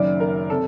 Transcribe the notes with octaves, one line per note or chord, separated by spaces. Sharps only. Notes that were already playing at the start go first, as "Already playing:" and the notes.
Already playing: F#1 F#2 D#3 D5
A#4
C3 A4